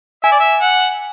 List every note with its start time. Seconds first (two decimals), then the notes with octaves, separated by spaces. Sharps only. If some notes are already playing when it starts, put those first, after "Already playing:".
0.24 E5 G#5
0.32 D5
0.40 E5
0.61 F#5